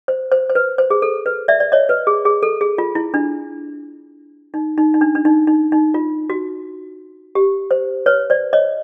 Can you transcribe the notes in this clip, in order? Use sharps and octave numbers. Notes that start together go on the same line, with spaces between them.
C5
C5
C5
B4
C5
G#4
A4
B4
D5 E5
D5
C#5 D#5
B4
G#4
G#4
A4
G#4
F4
E4
D4
D#4
D#4
D#4
D4
D4
D#4
D#4
D#4
F4
F#4
G4
C5
B4 C#5
C5 D5
C#5 D#5